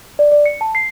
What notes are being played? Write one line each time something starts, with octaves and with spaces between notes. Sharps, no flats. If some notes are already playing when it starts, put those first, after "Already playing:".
D5
D5
C#7
A5
C7